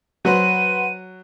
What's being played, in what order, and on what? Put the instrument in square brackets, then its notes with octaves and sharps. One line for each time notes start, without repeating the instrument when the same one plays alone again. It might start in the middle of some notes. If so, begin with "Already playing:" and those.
[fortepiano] F#3 [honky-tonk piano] F#4 B4 C5 [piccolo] D#7